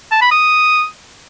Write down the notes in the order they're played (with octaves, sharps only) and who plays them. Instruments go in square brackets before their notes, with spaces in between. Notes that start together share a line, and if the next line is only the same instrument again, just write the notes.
[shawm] A5
B5
D#6